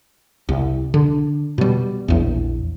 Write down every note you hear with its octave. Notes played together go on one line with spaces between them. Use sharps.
C2
D3
B2 G3
A#1 E2